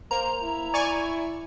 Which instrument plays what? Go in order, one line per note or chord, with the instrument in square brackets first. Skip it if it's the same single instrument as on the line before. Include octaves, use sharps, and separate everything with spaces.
[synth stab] A#3 [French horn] C5 [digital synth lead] A#5
[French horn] E4
[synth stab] D5 G#5 C#6